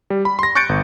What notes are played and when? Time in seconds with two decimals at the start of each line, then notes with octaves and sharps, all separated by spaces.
0.10 G3
0.25 B5
0.39 C6 A#6
0.55 C#6 F#6 G6 A6 C#7 D7
0.69 G1